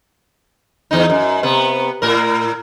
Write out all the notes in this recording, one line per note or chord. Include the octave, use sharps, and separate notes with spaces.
E2 D#4
F#2
C3 B3
A2 A#4